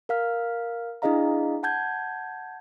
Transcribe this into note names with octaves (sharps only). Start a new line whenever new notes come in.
A#4 F5 F6
D4 E4 G#4 D#5 F5 A#5
F#5 A5 G6 G#6